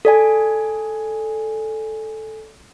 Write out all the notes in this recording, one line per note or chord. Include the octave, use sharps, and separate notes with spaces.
A4 D5 G#5